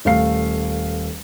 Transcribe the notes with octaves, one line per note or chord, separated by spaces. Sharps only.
D#1 A3 F5 C7